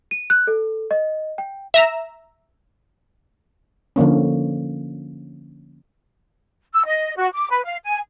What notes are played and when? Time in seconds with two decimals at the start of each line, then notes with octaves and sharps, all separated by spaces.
0.11 D#7
0.30 F#6
0.47 A4
0.91 D#5
1.38 G5
1.74 E5 A#5 E7
3.96 D3 F3 A#3 C#4
6.73 E6
6.87 D#5
7.17 F#4
7.33 D6
7.51 B4
7.64 F5
7.84 G#5